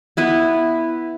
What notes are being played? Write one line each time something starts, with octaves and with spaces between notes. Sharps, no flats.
B3 E4 B4